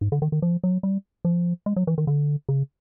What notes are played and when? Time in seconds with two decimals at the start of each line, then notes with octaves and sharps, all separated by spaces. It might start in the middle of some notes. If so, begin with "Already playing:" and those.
0.01 G#2
0.12 D3
0.22 D#3
0.32 D#3
0.42 F3
0.63 F#3
0.83 G3
1.25 F3
1.66 G#3
1.76 F#3
1.87 E3
1.98 D#3
2.07 D3
2.49 C#3